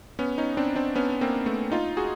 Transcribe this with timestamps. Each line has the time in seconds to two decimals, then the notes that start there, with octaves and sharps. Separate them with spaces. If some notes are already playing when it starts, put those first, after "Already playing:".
0.19 B3 C#4
0.38 C#4 D#4
0.57 C4 D4
0.76 C4 D4
0.95 B3 C#4
1.21 A#3 C4
1.46 A3 B3
1.72 D#4 F4
1.97 F#4 G#4